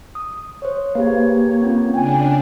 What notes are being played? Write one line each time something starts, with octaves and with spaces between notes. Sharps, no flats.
D#6
C5 C#5
A#3 G4 G#4 B4 C#5
C4 C#4 F4
C#3 D4 G5 G#5